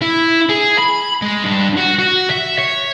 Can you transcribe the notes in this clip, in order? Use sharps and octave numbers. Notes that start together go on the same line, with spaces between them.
E4
G#4
B5
G#3
G2
F#4
F#4
E5
C#5